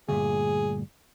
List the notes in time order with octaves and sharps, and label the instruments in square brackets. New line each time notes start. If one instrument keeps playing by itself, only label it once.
[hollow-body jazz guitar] D2 G2 A#2 [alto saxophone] G#4